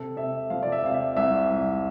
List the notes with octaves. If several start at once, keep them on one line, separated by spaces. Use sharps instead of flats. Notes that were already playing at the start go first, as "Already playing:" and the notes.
Already playing: C3 A4
C3 E5
F3 F5
D5
E5
C3 F5
E5
C2 E5
C2